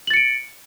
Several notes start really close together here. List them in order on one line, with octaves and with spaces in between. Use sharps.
F#7 A6 C#7 D7